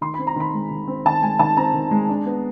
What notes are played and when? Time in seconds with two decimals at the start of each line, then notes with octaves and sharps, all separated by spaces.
0.01 D#3 C6
0.14 C4 B5
0.27 A#5
0.36 D#3 B5
0.54 G#3
0.71 D#3
0.87 C4
1.05 D#3 A5
1.22 G#3 G#5
1.39 D#3 A5
1.57 C4 A#5
1.74 D#3
1.91 G#3
2.09 D4
2.26 B3